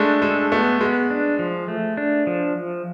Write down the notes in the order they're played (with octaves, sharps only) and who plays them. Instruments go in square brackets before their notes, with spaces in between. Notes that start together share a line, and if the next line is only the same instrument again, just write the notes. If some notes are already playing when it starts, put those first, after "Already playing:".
Already playing: [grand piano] G#3 A3 [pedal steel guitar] D4
[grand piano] G#3 [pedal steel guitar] A4
[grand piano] A3 [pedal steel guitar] B3
[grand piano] G#3 [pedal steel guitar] B3
[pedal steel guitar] D4
F3
A3
D4
F3